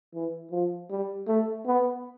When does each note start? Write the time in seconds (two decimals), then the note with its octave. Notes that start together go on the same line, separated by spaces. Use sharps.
0.14 E3
0.52 F3
0.91 G3
1.28 A3
1.66 B3